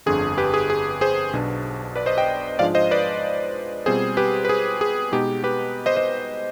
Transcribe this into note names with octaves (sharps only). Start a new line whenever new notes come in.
G1 F2 D3 G#4
G4 B4
G#4
G#4
G#4 C5
B1 B2 B3 D4
B4 D5
C5 D#5
D#5 G5
G#2 F3 G#3 D4 F4 D5 F5
C5 D#5
B4 D5
B2 G3 C4 F4 G#4 C5
G4 B4
B4
G#4
G#4
B2 G#3 B3 D#4 G4
G4 B4
C5 D#5
C5 D#5